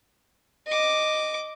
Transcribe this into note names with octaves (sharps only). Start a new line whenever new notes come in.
D#5 D6